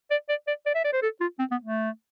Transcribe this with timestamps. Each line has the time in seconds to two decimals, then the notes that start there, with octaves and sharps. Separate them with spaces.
0.10 D5
0.29 D5
0.47 D5
0.66 D5
0.75 E5
0.84 D5
0.93 C5
1.02 A4
1.21 F4
1.39 C4
1.51 B3
1.64 A3